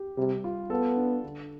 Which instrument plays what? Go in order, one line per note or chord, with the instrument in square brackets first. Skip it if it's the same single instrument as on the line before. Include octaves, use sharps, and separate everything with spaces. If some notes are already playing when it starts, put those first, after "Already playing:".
Already playing: [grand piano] G4
[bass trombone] C3 [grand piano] G3
[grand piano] F4
[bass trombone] B3 [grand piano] A4
[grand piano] D4
D3